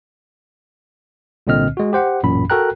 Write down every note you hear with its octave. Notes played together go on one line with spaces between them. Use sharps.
C2 A#2 D3 C4 D#5 F6
G#3 F#4
G4 C5 F#5
A1 F#2 A#2 B5
F#4 A4 A#4 G5 A#5 F#6